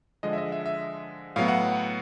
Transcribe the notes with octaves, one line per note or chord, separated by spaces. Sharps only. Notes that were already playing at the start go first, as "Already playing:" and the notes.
D3 F3 G#3 D#5
E5
D#5
E5
E5
A2 F#3 B3 F5
F#5